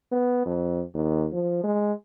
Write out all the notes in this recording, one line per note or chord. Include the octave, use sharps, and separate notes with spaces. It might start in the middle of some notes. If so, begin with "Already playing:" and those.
B3
F2
D#2
F3
G#3